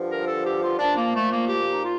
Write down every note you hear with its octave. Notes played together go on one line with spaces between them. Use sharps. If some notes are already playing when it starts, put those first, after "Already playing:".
Already playing: G2 D3 F3
A#4
A4
G4
F4
A#2 F3 D4
A#3
A3
A#3
G4
D#4
F4